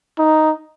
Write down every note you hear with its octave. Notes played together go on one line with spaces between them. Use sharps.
D#4